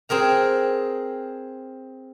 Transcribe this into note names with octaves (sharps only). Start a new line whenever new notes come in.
C4 G#4 A#4 A#5